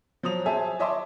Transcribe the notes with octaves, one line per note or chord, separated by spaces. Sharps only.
F3 F#3 D#6 F7
G#4 C5 E5 G#5 A5
C#5 D#5 E5 A5 C6 D6